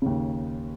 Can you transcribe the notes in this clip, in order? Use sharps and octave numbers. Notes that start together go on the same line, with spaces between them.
D#2 C#3